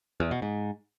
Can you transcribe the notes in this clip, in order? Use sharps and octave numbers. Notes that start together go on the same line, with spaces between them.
E2
B2
G#2